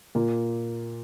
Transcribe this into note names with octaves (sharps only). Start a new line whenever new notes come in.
A#2 A#3